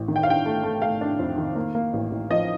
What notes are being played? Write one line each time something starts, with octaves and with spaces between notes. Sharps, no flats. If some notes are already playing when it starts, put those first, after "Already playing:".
Already playing: A1
D#3
G5
F5
D4 G5
A3
A3
A3 F5
D4
F2
D#3
A#3
A#3
A1
A1
F3 D#5